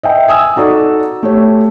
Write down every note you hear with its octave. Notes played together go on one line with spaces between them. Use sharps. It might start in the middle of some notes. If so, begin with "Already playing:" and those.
D#5 E5 G5
G#5 D#6 E6
D#4 F#4 A4 D5
A3 G4 C#5